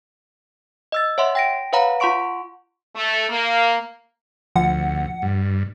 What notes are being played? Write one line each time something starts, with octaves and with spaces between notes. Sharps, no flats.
D#5 E6 A6
C#5 E5 F#5 C6
G5 A#6 D7
B4 C#5 F5 F#5 A#5 B5
F4 F#5 C6 C#6 D7
A3
A#3
D2 F3 F#5
G2